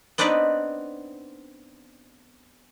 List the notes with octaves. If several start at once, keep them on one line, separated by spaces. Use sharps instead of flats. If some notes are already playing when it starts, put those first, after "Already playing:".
B3 C4 D4 D#4 B4 D5